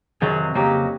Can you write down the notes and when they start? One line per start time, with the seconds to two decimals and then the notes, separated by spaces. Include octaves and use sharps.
0.21 F2 C3 D#3 F#3 G#4
0.55 F2 C#3 F#3 A#3 D#4 G4